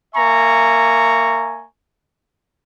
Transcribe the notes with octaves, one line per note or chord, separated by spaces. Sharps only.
A#3 E5 G#5 A#5 C#6